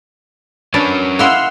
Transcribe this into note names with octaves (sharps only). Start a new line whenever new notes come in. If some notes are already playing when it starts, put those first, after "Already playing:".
C#4 D4 A#4 B4 C#5 A5
A#3 E4 D#5 F#5 C6 E6 F6